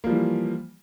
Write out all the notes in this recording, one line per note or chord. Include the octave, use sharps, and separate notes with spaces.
E3 F3 G3 A#3